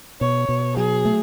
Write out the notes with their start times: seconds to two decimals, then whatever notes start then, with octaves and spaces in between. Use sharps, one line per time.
0.21 B2 C#5
0.49 B2
0.77 F#3 G#4
1.05 A3